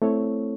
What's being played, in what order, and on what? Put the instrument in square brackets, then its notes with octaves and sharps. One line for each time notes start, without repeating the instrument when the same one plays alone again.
[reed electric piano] A3 C4 E4 A4 C#5